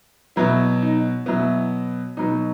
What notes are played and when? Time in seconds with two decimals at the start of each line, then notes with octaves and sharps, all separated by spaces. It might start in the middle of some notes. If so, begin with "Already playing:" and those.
0.36 B2 F#3 B3 E4
0.82 D#4
1.26 B2 F#3 B3 E4
2.17 B2 F#3 B3 D#4